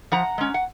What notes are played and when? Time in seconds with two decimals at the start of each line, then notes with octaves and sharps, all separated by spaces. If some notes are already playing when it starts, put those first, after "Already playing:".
0.12 F3 F#5 A#5
0.38 G#3 C#4
0.54 F#5